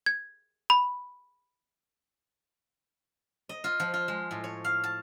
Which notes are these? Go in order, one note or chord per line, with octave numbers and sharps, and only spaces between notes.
G#6
B5
D#5
F4
F3
F4
G#3
A2
C#5
F5
A5